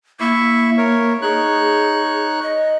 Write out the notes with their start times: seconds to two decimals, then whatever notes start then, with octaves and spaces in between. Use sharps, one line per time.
0.20 A#3 E4 E5 C#6
0.78 A#4 C#5
1.22 D#4 G#4 C#5 F#6
2.42 D#5